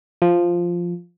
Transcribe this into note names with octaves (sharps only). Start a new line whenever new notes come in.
F3